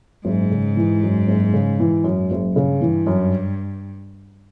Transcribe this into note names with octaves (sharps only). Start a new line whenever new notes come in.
F#1 G#2
C#3
E3
F#2
F#1
C#3
E3
F#2
F#1
G2 C#3
E3
F#2